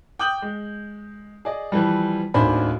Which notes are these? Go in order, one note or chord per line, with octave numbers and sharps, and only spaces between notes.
G5 D6 D#6 G6 F#7
G#3
G#4 D5 D#5
E3 F3 G3
D1 D#2 D4 C5 G#5 B5